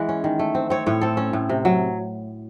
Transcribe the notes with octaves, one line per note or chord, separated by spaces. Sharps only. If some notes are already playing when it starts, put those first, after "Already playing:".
Already playing: E3 G#3 F#5
C#4
D#3
A3
C4
C4 C#5
A2 C#5
C4 A4
C#4
A2
C3
F#3